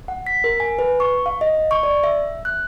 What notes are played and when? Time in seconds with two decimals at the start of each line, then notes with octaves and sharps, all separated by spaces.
0.08 F#5
0.27 B6
0.44 A#4
0.60 G#5
0.79 B4
1.00 C#6
1.26 F5
1.41 D#5
1.71 C#6
1.83 D5
2.04 E5
2.45 F#6